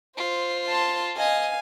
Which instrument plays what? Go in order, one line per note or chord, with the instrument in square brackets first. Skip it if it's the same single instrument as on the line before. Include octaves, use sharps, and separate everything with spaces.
[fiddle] F4 [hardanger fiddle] C5
[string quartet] A5 C6
[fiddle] D#5 [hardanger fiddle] F5 [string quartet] G#5